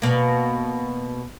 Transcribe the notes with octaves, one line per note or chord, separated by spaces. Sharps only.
B2 A#3